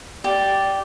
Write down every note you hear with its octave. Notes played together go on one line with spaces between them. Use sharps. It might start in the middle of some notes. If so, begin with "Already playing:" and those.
G4 D5